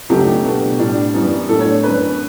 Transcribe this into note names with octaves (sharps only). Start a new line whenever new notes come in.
C#2 C#3 F#3 A3 D4 G4
B2 A3 D4
A2 G3 D4
F#2 E3 G3 B3
A2 F#3 A3 D4 A4
C#5
F#2 D3 G3 B4